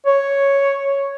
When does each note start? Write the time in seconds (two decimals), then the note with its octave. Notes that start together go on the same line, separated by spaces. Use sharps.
0.06 C#5